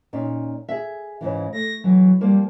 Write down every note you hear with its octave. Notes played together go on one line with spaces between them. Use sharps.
A#2 C#4 D#4
G#4 E5
G#2 C#3 E3
A3 A#6
E3 F#3
F3 G3 A#3